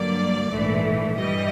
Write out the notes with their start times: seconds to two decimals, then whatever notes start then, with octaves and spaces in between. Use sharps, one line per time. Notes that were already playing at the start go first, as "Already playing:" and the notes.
Already playing: G2 D3 F#3 A#3 D5
0.51 A#1 G#2 E3 A3
1.17 G2 E3 G3 D#5